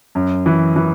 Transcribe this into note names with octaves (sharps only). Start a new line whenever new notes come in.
F#2
E3
E3